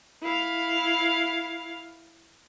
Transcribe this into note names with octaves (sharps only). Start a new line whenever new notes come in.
E4 F5